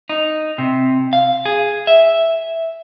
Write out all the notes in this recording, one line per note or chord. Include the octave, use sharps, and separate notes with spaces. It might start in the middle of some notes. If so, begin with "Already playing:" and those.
D#4
C3
F5
G#4
E5